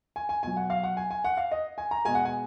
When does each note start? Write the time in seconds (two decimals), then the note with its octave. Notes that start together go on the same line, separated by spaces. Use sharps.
0.16 G#5
0.29 G#5
0.43 B2 F#3 G#5
0.57 F#5
0.70 F5
0.84 F#5
0.97 G#5
1.11 G#5
1.24 F#5
1.37 F5
1.52 D#5
1.78 G#5
1.91 A#5
2.05 B2 G#3 G#5
2.15 F#5
2.25 G#5